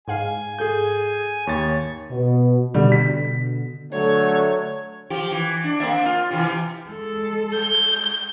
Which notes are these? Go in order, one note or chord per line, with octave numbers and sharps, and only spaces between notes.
G#2 F5 G#5
G#4 A4 G6
D#2 C#5 A6
B2
B2 D3 G3
B6
D3 F#3 A3 C#5
F3 G4
E3
D4
A#3 C4 E5
F4
C3 D#3 E3
G#3 A4
G6